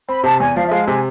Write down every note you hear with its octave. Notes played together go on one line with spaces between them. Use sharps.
C4 B5
C3 A5
E2 G#5
F3 F5
E5
G#3 F5
C3 G#5